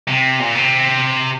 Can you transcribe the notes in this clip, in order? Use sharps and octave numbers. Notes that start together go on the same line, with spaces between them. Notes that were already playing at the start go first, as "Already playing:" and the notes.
C3
A#2
C3